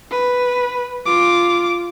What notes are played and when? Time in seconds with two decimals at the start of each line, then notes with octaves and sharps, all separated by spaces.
0.11 B4
1.06 F4 D6